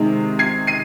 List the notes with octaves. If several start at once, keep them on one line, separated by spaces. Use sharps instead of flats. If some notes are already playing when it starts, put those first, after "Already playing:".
Already playing: C3 D#3 G#3
G#6 C7
C7 D#7